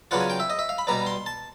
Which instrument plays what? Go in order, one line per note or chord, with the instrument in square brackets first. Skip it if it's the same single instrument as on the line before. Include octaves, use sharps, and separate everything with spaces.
[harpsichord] C#3 F#3 B3 D4 F4 F#5
G#5
G5
E5
D#5
E5
F5
B5
B2 G3 B3 D4 A#5
C6
A5